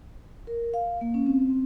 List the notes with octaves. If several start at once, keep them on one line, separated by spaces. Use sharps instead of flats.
A#4
F5
A#3
C#4
C4
C4